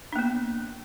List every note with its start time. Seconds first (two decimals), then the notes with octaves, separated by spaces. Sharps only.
0.13 D4
0.16 A#3
0.19 B3